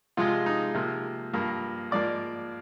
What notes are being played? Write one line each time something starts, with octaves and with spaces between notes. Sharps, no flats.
C3 F3 G#3 F4
D#4
C3 F3 A#3
G2 F3 A#3
G#2 F3 A#3 D5